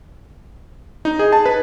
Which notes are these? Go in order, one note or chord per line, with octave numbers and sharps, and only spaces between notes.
D#4
G#4
A5
B4